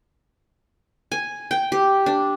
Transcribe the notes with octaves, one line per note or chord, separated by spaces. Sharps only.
G#5
G5
G4
D4